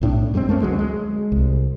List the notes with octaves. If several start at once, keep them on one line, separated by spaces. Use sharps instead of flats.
B1 A2 C4 D4
F#2 G3 G#3 C4
A3 A#3 C#4
D2 F#3 G#3
G#3
C2